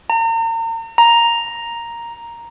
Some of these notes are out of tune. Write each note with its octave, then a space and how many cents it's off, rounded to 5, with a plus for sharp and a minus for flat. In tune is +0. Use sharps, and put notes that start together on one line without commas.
A#5 -40
A#5 +5